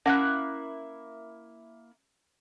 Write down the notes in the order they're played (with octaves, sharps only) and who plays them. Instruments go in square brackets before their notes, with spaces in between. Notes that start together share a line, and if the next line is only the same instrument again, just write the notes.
[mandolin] A#3 E4 F#6 [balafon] C#4 F#5